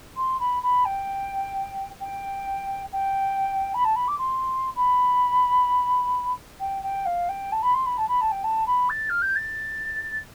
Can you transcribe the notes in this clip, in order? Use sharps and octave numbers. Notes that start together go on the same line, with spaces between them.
C6
B5
B5
G5
G5
G5
B5
A5
B5
D6
C6
B5
G5
G5
F5
G5
A5
B5
C6
B5
A5
B5
A5
G5
A5
B5
A6
F6
G6
A6